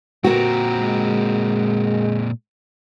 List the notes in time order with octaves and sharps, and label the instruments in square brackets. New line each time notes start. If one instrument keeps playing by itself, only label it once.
[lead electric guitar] A#2 C4 [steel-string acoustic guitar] F#4 A#4
[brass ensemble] G#3